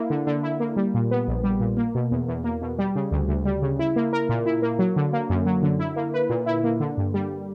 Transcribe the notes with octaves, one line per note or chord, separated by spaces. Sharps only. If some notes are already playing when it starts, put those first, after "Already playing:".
Already playing: A#3 E4
D3
D3
E4
A#3
G3
A#2
B3
A#1
G3
A#2
A#3
B2
E2
E2
A#3
B2
G3
C#3
D2
D2
G3
C#3
E4
A#3
A#4
A#2
E4
A#3
F#3
D3
A#3
F#2
F#3
D3
E4
A#3
B4
A#2
E4
A#3
D3
G2
G3